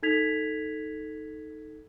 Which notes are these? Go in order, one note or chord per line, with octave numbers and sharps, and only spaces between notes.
D#4 A4 G#6 B6 F7